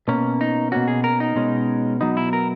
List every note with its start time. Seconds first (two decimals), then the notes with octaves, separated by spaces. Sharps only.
0.08 B2 A#3 C#4
0.41 D#4
0.72 B2 A#3 C#4 F#4
0.88 G#4
1.04 A#4
1.20 D#4
1.36 B2 G#3 C#4
2.01 B2 F#3 B3 D#4
2.17 E4
2.33 A#4